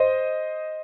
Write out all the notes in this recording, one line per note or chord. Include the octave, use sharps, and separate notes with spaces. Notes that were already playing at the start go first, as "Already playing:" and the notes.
Already playing: C5 D#5